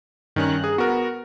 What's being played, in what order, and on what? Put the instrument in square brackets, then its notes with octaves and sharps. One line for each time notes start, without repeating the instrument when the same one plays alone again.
[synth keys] G2 A#5 F#6 [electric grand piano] D#3 C#4
[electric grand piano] G#4
[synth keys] B3 [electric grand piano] F#4 A#4